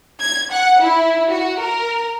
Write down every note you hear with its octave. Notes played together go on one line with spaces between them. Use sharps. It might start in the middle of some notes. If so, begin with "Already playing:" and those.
G#6
F#5
E4
F#4
A#4